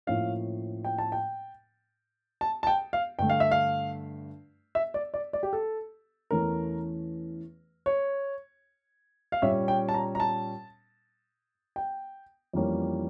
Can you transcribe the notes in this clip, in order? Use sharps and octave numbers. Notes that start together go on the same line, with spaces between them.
A2 F3 A#3 C#4 F5
G5
A5
G5
A5
A5
G5
F5
G2 D3 A3 G5
F5
E5
F5
E5
D5
D5
D5
G4
A4
E2 E3 A3 C#4 A#4
C#5
F5
A#2 G3 C#4 E5
G5
A5
A#5
A#5
A5
G5
F2 E3 G3 A#3 C#4